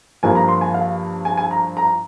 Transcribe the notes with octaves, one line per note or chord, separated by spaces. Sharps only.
G2 F3 A#3 G#5
A#5
C6
G#5
F5
G#5
G#5
A#5
A#5